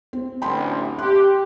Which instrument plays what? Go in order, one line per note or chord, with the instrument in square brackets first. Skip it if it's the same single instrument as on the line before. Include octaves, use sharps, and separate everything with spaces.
[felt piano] C4
[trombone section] A1 D2 [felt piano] G5 B5 C6
[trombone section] G4 [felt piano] C6 F#6